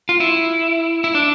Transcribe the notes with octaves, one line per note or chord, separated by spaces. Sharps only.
F4
E4
E4
D4